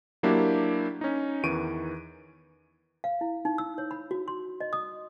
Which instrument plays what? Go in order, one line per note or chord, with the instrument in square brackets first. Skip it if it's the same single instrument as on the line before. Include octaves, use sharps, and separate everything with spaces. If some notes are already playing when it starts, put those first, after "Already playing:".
[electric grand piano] F#3 A#3 D4 E4 G4
C#4 D#4
E2 D#3 E3 C#6 D7 D#7
[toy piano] F5
E4
D#4
E6
C#5
B5
F#4
C6
D#5
D#6